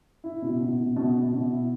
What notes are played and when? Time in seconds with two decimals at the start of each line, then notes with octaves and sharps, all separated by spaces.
0.24 E4
0.42 B2
0.60 B2
0.78 B2
0.96 B2
1.15 B2
1.33 B2
1.51 E4